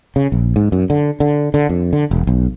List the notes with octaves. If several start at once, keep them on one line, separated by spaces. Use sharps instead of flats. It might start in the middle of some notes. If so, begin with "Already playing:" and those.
C#3
A#1
G#2
F#2
D3
D3
D3
F2
D3
E1
B1